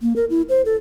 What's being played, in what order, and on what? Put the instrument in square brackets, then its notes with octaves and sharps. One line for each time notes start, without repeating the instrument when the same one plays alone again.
[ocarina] A#3
A#4
E4
C5
A4